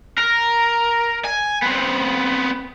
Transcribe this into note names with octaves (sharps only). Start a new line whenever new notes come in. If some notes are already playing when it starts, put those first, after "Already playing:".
A#4
G#5
B3 C4